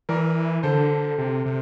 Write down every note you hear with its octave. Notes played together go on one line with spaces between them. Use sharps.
E3 A#4 D5
D3 A4 C5
C3
C3